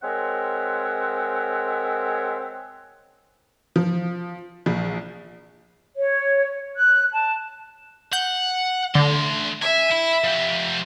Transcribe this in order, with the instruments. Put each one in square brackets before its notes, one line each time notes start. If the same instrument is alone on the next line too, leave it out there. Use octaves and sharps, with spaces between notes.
[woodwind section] G#3 C4 A#4 C#5 E5 F#5
[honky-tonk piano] F3
A#1 F3
[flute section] C#5
F#6
A5
[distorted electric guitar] F#5 [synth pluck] G6
[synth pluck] D3 [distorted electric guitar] A3 C6
[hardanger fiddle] E5 [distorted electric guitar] G#5
[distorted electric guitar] E4
F3 G4